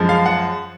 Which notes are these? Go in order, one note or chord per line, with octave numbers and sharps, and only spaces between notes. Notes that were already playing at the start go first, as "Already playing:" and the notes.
Already playing: F#2 F3 G#3
F5
F#5